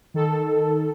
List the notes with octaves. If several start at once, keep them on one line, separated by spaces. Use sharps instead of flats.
D#3 A4